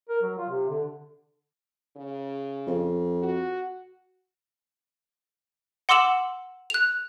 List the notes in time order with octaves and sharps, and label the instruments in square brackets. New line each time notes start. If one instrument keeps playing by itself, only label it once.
[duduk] A#4
F#3
F4
C3
D3
[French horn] C#3
[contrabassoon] F2
[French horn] F#4
[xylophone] F#5 C6 D6 E6 E7 F#7
F#6 F7